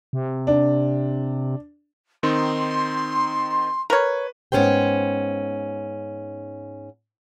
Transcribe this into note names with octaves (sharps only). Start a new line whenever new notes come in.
C3
D4
D#3 C4 D#4 C6
A#4 B4 C#5
G#2 B3 C#4 A#4 C5 G5